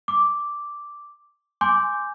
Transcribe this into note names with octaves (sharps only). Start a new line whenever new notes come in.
D6
G#5 C6 D6 G6